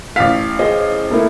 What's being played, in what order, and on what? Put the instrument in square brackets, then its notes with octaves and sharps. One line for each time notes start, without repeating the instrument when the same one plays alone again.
[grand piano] A1 F5 [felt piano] B6
[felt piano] G#4 C5 D#5
A3 A#3 E4